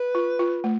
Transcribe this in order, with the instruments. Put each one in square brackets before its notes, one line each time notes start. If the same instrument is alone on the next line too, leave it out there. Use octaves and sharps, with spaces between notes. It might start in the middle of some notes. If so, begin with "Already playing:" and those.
Already playing: [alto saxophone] B4
[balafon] F4
F4
A3